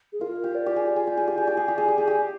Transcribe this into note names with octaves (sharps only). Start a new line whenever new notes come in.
G#4
F4 A#4
G4
D5
G4
G#4
G4 D5
G#4
G4
G#4
G4
G#4
G4
G#4
G4
G#4
G4
G#4
G4